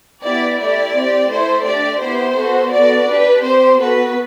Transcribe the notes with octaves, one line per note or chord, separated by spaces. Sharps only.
B3 E4 G4 D5
A3 E4 G4 D5
C4 G4
A3 E4 A4 C5
A3 D4 G4 D5
B3 E4 G4 C5
B3 F#4 A4
B3 F#4 A4 D5
D4 G4 B4
C4 G4 C5
B3 F#4 A4 B4